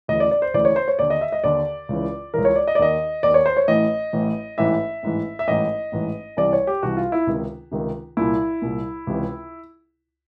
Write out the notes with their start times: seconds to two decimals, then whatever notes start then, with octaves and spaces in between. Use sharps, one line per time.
0.08 D2 C#3 E3 D#5
0.20 D5
0.31 D5
0.42 C5
0.54 D2 C#3 E3 D5
0.65 C#5
0.76 C5
0.88 C#5
0.99 D#2 D3 D5
1.10 D#5
1.21 E5
1.32 D#5
1.43 D#2 D3 D5
1.89 C#2 C#3 E3
2.34 C#2 C#3 E3 A#4
2.45 C#5
2.56 D5
2.67 D#5
2.75 D5
2.79 D#2 D#3 D#5
3.23 D#2 D#3 D5
3.34 C#5
3.46 C5
3.57 C#5
3.68 A1 A2 E3 D#5
4.13 A1 A2 E3
4.58 A1 G#2 E3 E5
5.03 A1 G#2 E3
5.39 E5
5.47 A1 G#2 E3 D#5
5.92 A1 G#2 E3
6.37 C2 C3 E3 D5
6.53 C#5
6.67 G4
6.82 C2 C3 E3 F#4
6.97 F4
7.12 E4
7.27 C#2 C3 D#3
7.71 C#2 C3 D#3
8.17 C2 A#2 E4
8.62 C2 A#2
9.07 C#2 C3 E3